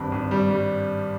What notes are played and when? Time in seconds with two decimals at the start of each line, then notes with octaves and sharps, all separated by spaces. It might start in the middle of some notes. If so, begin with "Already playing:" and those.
Already playing: G#1 G2
0.12 G#1
0.31 G3
0.50 G3